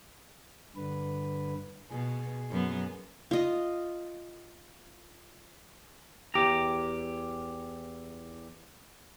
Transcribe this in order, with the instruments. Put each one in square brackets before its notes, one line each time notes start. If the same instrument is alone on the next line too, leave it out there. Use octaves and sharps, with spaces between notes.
[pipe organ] G2 D3 B4
[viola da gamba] B2 [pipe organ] G#4
[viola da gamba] F#2 B3
[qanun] F4 D#5
[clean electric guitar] E2 G4 A#5